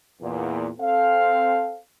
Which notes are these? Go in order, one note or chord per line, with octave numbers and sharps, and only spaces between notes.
E2 A#2
C4 A4 F5